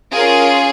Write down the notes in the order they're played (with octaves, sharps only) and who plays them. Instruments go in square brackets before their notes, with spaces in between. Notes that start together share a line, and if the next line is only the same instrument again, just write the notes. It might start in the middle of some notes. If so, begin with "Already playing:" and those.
[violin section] C#4 F4 G#4 A#4